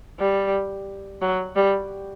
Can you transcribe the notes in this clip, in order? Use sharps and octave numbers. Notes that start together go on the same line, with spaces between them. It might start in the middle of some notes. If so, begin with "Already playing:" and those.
G3
F#3
G3